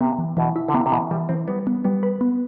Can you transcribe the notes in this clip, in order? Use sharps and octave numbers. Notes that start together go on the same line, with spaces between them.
C3 B3
E3
B2 E3
E4
D3
C3 B3
C3
B2 E3
E3 G3
E3 C4
G3 B3
B3
G3 B3
B4
B3